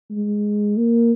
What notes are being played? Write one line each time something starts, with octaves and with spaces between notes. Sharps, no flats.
G#3
A#3